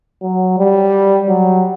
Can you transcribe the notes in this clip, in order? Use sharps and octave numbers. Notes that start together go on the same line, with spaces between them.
F#3
G3
F#3